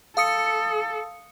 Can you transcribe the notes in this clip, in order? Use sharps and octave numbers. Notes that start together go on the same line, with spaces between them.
A4 F5 D#6 C#7